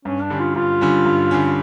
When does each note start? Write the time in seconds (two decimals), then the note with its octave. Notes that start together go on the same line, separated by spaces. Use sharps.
0.05 G2 C#4
0.22 D4
0.30 D3 G3 C#4
0.39 F4
0.55 G2 F4
0.81 D3 G3 C#4
1.05 G2
1.31 D3 G3 C#4